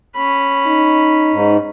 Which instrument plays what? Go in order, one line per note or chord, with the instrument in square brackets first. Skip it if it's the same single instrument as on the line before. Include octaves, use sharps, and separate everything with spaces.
[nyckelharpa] C#4 B5
[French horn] D#4
[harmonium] G#2